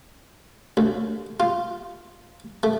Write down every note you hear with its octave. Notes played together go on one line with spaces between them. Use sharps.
D2
F4
A3